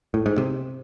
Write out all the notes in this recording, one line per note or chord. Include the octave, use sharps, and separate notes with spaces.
A2
G#2
C3